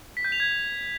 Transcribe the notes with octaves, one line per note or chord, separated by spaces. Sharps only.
B6
G6
F7
G#6